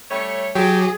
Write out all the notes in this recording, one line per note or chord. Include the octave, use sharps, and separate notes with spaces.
G3 A3 C#5
F#3 G4 G#4